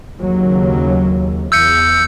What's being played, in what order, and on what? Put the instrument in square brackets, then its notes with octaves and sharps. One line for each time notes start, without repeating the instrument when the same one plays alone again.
[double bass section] D#2 C#3 F#3
[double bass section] E2 [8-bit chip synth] E6 G6 C#7